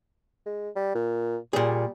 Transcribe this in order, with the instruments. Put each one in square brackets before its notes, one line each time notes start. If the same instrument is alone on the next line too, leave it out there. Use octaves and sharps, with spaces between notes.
[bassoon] G#3
G3
A#2
[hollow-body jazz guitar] A#2 G#4 [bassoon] G3